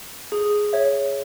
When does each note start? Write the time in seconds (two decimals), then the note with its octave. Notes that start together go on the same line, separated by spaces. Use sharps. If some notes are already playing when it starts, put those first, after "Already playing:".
0.32 G#4
0.73 C#5 E5